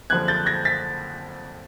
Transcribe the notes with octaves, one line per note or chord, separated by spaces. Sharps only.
F#1 F2 D3 F3 F#6 G#6
G6 A6
G#6 A#6
A6 B6